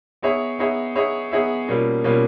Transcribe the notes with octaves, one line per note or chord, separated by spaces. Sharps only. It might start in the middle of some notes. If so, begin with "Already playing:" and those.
B3 D#4 G#4 C#5 E5
B3 D#4 G#4 C#5 E5
B3 D#4 G#4 C#5 E5
B3 D#4 G#4 C#5 E5
B2 G3 A#3 C#4 F4
B2 G3 A#3 C#4 F4